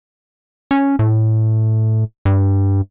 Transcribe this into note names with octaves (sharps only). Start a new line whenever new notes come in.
C#4
A2
G2